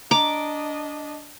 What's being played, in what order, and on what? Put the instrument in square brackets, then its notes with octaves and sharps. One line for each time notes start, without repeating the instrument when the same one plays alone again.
[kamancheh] D4 D#5 [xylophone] A#5 [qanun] D6